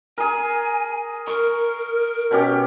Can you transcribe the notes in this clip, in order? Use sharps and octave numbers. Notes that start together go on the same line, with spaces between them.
G#4 A#4 G#5
A#4 C#6
B2 C#4 G4